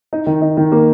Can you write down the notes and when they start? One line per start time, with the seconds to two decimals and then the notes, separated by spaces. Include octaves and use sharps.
0.13 D#4
0.27 D#3
0.42 D#4
0.57 D#3
0.72 A#3